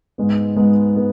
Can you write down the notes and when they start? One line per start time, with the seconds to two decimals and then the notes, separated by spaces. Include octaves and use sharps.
0.18 G#2 G#3 B3
0.56 G#2 G#3 B3
0.96 G#3 B3